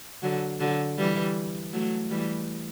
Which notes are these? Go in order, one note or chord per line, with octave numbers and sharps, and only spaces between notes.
D3 F#3
D3 F#3
E3 G3
F#3 A3
E3 G3